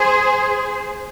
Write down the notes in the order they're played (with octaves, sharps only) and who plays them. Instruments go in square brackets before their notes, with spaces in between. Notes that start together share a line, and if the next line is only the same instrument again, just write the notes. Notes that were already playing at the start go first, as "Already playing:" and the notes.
Already playing: [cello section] G#4 C5